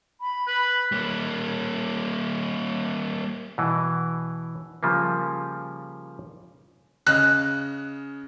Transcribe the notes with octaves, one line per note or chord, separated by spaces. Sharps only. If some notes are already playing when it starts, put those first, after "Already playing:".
B5
B4
G3 A#3
B2 E3
C#3 F3 G3 A#3
C#3 D#5 F6 F#6